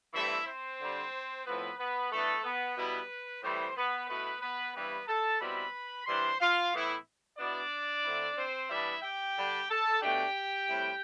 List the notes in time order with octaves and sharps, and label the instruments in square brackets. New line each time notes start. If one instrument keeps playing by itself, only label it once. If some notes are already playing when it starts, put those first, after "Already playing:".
[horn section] G2 E3 A3 C4 E4 E5
C4 C5
D3 G3 D4
A2 F3 B3 C4 B4
B3 B4
E3 A3 B3 D4 A4
B3 B4
B2 G3 B3 E4
A2 E3 G3 C4 C5
B3 B4
B2 A3 B3 E4 B4
B3 B4
G2 E3 G3 B3 C4 E4 B4
A4 A5
B2 G3 C4 E4 B4 B5
E3 G3 D4 C5 C6
F4 F5
A2 E3 B3 E4
B2 B3 D4 E4 D5
D3 A3 C4 E4
C4 C5
E3 G3 B3 D4 E4 E5
G4 G5
D3 G3 D4
A4 A5
B2 A3 D4 G4 G5
A2 G3 C4 E4